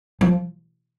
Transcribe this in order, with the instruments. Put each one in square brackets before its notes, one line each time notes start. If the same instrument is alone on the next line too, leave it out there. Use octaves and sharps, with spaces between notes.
[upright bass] F3